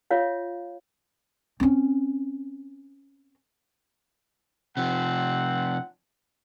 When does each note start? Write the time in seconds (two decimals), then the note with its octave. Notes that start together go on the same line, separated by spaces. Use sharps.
0.11 F4 C#5 E5 F5
1.60 C4 C#4
4.77 C3 F3 C4 F#5